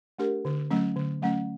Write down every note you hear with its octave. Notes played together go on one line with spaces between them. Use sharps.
A3 D4 G4 A#4
D3
F#3 A3 C#4
D3
F#3 A3 C#4